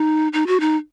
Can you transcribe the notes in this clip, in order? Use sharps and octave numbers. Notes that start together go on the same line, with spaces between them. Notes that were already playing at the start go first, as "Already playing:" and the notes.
Already playing: D#4
D#4
F#4
D#4